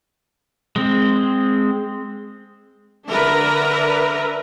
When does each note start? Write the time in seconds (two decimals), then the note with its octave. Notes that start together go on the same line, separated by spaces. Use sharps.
0.76 G#3 C4
3.09 D3 D4 A#4 B4 E5 A#5